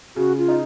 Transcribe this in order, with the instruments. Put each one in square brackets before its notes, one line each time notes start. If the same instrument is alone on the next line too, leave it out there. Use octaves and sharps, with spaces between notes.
[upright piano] C#3 [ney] F#4
[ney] F4
[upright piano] D#4